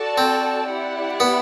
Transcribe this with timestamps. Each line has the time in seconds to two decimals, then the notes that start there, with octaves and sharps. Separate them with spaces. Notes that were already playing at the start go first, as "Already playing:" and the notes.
Already playing: F#4 A4 D5 A5
0.18 C4
0.70 E4 G4 D5 F#5
1.20 B3